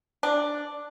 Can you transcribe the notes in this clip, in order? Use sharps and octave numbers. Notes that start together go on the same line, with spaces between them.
D4